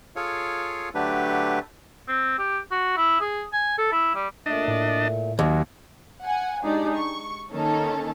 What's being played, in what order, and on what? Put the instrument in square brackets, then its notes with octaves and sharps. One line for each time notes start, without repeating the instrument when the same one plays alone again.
[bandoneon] F4 G#4 A4 C#5 F5
D3 F#3 A3 D4 G4 B4
[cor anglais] C4
G4
F#4
E4
G#4
G#5
A4
E4
G3
[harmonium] A#2 A3 [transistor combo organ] D4 D#5 A5
[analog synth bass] A2
[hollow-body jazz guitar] D#2 [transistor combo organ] F#3
[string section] F#5 G#5
G#3 D4 D#4 G4 G#4 D5
C#6
D#3 A#3 C#4 D#4 A4